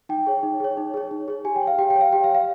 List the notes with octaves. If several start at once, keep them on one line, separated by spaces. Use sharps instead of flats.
D#4 G5
G#4 C#5
D#4
G#4 C#5
D#4
G#4 C#5
D#4
G#4 C#5
G4 G#5
G5
C#5
F5
G4 G5
G5
C#5
F5
G4 G5
F5
C#5
F5